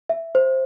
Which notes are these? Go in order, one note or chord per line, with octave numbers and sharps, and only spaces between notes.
E5
C5